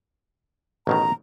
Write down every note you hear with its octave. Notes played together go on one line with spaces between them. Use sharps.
A1 B2 D#3 A#5